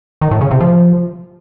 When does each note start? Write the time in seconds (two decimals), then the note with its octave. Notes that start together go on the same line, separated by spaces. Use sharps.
0.21 D#3
0.31 A2
0.41 C#3
0.51 C3
0.61 F3